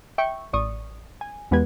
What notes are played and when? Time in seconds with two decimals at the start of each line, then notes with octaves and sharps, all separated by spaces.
0.18 E5 G5 C#6
0.53 A1 D5 C#6 D#6
1.21 G#5
1.51 E2 G#3 B3 G4 B4 G#6